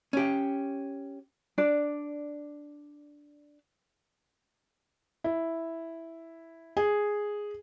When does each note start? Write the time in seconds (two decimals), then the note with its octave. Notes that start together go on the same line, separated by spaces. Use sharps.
0.13 C#4 G4
1.58 D4 D5
5.24 E4
6.77 G#4